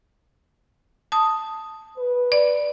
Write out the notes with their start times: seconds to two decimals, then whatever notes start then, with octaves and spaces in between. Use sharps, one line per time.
1.12 A5 D#6
1.98 B4
2.32 D5